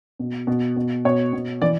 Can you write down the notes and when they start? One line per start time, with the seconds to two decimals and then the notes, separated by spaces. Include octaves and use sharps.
0.19 B2
0.47 B2
0.76 B2
1.05 B2 C#5
1.33 B2
1.62 E3 D5